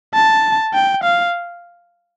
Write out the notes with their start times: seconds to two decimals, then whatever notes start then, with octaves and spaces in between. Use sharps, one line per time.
0.14 A5
0.74 G5
1.03 F5